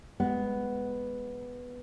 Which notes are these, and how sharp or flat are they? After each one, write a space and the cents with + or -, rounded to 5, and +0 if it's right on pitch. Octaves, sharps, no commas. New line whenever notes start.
G#3 -5 B3 +0